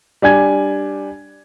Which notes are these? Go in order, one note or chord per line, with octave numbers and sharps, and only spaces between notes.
G3 D4 G#5 G#6